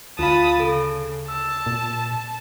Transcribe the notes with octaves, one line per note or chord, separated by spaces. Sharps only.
D2 F4 F5 A5 B5 D#6
C#3 A4
A5 E6
A#2